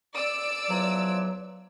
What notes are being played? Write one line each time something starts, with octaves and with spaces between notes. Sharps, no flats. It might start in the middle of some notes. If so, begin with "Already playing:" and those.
D5 E6 D7
E2 F3 F#3